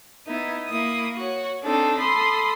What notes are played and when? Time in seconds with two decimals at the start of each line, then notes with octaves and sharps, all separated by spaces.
0.27 B3 D#4 E4
0.68 A#3 E4 D#6
1.17 F#4 C#5
1.63 C4 D4 D#4 A4
1.99 A4 B5 C6 D#6